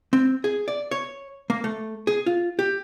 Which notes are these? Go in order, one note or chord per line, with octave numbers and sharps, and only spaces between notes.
C4
G#4
D5
C#5
A#3
A3
G#4
F4
G4